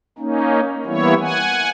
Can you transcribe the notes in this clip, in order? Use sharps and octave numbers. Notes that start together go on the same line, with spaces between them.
A#3 C#4 D#4
E3 G3 A#3 B3 E4 C#5
F#5 G#5